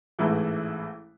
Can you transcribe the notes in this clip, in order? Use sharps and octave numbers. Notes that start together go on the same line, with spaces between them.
A1 G#2 E3 A3 E4